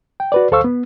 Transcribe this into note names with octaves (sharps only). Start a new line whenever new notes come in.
G5
F#4 B4 D5
D2 A4 C5 F5 C#6 E6
B3